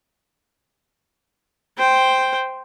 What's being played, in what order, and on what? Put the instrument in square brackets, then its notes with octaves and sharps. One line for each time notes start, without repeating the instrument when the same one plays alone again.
[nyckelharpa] C5 G5